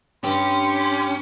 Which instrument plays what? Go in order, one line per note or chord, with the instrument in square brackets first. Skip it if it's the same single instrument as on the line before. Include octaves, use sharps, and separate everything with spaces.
[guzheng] G2 [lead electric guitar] C#4 [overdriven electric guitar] G4 [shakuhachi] C6